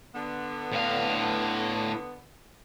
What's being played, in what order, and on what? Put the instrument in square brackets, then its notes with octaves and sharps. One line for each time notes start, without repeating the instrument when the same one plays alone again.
[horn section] D3 B3
[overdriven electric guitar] A2 F5